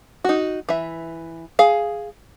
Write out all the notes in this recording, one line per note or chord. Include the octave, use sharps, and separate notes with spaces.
D#4 F#4
E3 E5
G#4 F5